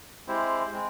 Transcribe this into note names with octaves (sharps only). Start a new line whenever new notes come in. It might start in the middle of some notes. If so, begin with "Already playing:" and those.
G#3 C4 E4 G4 C5
G#3 C4